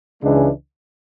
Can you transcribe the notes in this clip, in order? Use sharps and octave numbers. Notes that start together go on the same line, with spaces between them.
C#2 C#3 E3 G#3 D4